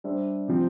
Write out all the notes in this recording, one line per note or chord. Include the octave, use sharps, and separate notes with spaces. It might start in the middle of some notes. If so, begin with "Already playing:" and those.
G3 D4 G4 C5 E5
C3 F3 C4